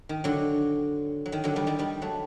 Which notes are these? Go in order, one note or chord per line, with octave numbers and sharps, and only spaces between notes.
D#3
D3 F#3
F#3
D#3
D3 F#3
D#3 G3
D#3 G3
D#3 G3
F#3 A3